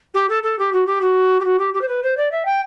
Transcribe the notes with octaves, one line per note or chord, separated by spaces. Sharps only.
G4
A4
A4
G4
F#4
G4
F#4
G4
F#4
G4
G4
C5
B4
C5
D5
E5
G5